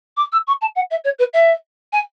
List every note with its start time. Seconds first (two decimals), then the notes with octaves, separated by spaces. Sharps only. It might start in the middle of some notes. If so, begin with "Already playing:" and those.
0.17 D6
0.32 E6
0.47 C#6
0.61 A5
0.75 F#5
0.91 E5
1.04 C#5
1.19 B4
1.33 E5
1.93 G#5